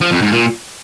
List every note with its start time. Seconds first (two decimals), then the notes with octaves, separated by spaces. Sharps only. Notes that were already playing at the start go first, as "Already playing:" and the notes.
0.01 F3
0.11 F2
0.22 G#2
0.32 A#2